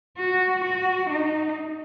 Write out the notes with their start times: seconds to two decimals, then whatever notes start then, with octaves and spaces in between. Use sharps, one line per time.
0.18 F#4
0.64 F#4
1.10 D#4